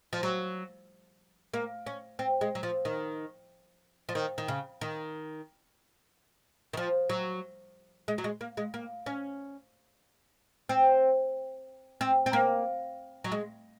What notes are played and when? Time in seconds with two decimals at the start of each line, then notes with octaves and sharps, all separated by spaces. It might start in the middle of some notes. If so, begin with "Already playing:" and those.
0.13 F3
0.23 F#3
1.54 A#3
1.87 C#4
2.19 C4
2.41 G#3
2.55 F#3
2.63 F3
2.85 D#3
4.09 F3
4.15 D#3
4.38 D#3
4.48 C#3
4.81 D#3
6.73 D#3
6.77 F3
7.10 F#3
8.08 G#3
8.18 F#3
8.24 G#3
8.41 A#3
8.57 G#3
8.74 A#3
9.06 C#4
10.69 C4
12.01 C4
12.26 C4
12.33 A#3
13.24 F#3
13.32 G#3